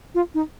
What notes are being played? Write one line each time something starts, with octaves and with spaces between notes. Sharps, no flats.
F4
D#4